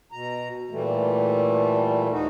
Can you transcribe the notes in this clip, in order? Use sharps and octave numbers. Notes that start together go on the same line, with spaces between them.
B2 A#5
A#2 E3 G3 A3
D#2 D#4 F#4